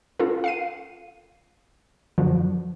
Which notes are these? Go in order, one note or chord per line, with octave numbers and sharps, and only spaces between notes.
C#4 F4 A4 A#4
F5 C7 D#7
F#2 D3 F3 F#3